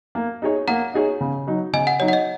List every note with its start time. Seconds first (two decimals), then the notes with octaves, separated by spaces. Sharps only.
0.15 A#3
0.42 D#4 G#4 C#5
0.68 A#3 F#5 A#5
0.94 D#4 G#4 C#5
1.21 C#3
1.47 F#3 D#4
1.73 C#3 D#5 G#5
1.87 F#5
2.00 F#3 D#4 C#5
2.08 F#5
2.13 D#5